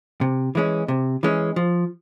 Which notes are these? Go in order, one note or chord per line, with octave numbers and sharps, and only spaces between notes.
C3
E3 G#3 C#4
C3
E3 G#3 C#4
F3